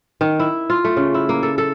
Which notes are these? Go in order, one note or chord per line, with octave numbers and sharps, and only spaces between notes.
D#3
E4
F4
A3
C#3
E4
A#3
A4
A4